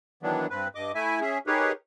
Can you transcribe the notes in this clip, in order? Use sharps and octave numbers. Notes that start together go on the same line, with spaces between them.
D#3 E3 F#3 B3 D4
G2 C4 B4
G2 D#5 D6
A3 E4 E5 G#5
C#4 G#4 E5
D#4 G4 G#4 A#4 B4 C#5